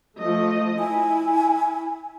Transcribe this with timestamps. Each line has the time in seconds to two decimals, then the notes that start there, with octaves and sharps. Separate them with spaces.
0.19 F3 A3 D#5
0.79 E4 G#5